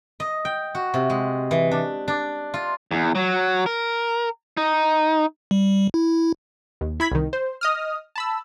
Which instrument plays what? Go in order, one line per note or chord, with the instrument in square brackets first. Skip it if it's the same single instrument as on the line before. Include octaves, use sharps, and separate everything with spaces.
[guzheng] D#5
G5
F#4
C3
G#3
E3
D4
D4
F4
[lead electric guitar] E2
F#3
A#4
D#4
[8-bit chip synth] G3
E4
[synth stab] D#2
E4 B5 G#6 B6
C2 D#3
C5
D#5 D#6 F6
A5 B5 E6